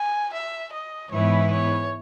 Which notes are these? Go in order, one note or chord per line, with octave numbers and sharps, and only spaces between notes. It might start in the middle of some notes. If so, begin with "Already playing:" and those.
Already playing: G#5
E5
D#5
G#2 E3 B3 E4 C#5
C#5